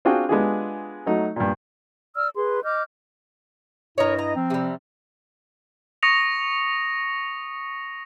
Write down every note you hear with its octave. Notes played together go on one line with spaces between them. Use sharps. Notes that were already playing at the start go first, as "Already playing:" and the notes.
C4 D4 F4 F#4 G#4 G5
G#3 B3 D4 F4 G4 G#4
F#3 A3 D#4
G2 A#2
D5 E6 F6
G#4 B4 C6
D#5 D6 F6 G6
G2 E4 A#4 C#5 D#5
A#5
F3 C4
C3 G3
C#6 D#6 A#6 C#7 F7